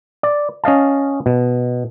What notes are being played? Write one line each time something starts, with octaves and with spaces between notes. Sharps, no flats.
D5
C#4 D#5 F5 A5
B2